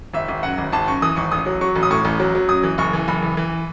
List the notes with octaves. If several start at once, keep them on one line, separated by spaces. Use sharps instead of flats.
G#1 E5
G#1
F#2 F#5
G#1
G#1 A5
F#2 C#6
E3 D#6
G#1 C#6
A1 D#6
F#3
F#3 C#6
A1
D#6
A2 C#6
A1
F#3
F#3
F#2 D#6
E3
F#1 C#6
E3
F#1 B5
E3
E3